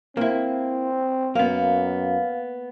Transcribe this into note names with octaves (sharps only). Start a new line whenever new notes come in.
A#3 C4 E4
F#2 A#3 B3 F5